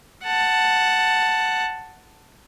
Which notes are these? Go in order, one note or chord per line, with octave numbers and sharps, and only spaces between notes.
F#5 A5